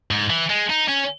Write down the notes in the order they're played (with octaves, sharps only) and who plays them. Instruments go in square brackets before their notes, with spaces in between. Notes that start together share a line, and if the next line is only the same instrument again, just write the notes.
[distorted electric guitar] G#2
E3
G#3
D#4
C#4